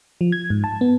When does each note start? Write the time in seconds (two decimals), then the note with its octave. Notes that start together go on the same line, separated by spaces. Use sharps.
0.21 F3
0.32 G#6
0.50 G#2
0.64 A5
0.81 B3